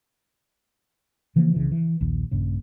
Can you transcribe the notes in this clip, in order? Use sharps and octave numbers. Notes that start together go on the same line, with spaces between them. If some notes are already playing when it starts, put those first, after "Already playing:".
C#3 E3 F3 A#3
C2 C#3 E3
E3
A#1 D#2
D#1 A#1 G2 C#3